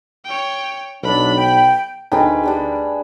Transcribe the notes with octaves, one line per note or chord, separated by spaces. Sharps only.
C#5 G5
B1 F#3 D4 B5
G5
D2 D#4 G#4 B4 G5 A5
G3 D4 G#4